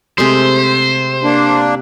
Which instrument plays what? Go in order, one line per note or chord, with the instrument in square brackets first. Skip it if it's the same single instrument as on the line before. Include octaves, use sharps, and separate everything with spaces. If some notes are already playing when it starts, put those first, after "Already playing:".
[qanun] C3 G#3 A3 [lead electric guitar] C5
[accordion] A#3 D4